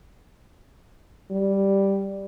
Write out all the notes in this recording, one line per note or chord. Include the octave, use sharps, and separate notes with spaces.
G3